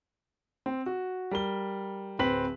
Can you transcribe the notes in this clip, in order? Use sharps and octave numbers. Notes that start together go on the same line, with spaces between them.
C4
F#4
G3 A#4 G7
D1 C4 B4 B6 F#7